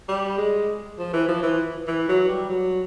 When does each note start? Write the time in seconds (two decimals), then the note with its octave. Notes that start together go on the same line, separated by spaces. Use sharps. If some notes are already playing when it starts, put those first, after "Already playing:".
0.08 G3
0.38 G#3
0.99 F3
1.13 E3
1.28 F3
1.43 E3
1.88 E3
2.09 F#3
2.28 G3
2.49 F#3